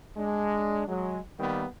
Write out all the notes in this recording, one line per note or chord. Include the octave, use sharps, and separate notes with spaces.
G#3 D4
F#3 G#3
D#3 G3 A#3 B3